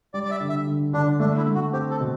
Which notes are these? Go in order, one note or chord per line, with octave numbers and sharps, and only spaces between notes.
G3 D5
D5
E5
D3
E5
D3
D3 D4
A3 D4
E4
A3
F#4
C4 G4
A4
B2